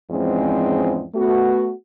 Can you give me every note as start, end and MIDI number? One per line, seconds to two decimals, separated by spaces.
0.11 1.05 40
0.11 1.05 44
0.11 1.05 53
0.11 1.05 56
0.11 1.05 60
0.11 1.05 61
1.15 1.71 57
1.15 1.71 59
1.15 1.71 66